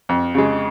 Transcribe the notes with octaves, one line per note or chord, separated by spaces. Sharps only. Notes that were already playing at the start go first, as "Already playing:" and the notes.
F2
C#3 G#3